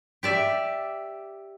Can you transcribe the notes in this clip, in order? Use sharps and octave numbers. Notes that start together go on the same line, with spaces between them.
G4 D5 E5